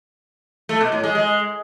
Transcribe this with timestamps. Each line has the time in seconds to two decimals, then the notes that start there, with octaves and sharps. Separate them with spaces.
0.69 A3
0.81 B2
0.92 A2
1.03 G#3
1.15 G#3